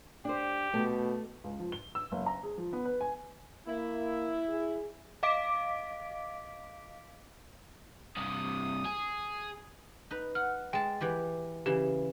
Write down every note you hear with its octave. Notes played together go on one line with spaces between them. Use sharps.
D4 G4 C5
B2 A3
C#2
F3
G7
E6
F#1
A#5
G#4
F3
B3
B4
G#5
A#3 E4
G#4
D#5 F5 D6 B6 D7
G2 C3 D#6
G#4
D#4 B4
F#5 F6
G#3 G5 A5
E3 G4 B4
C#3 E3 G4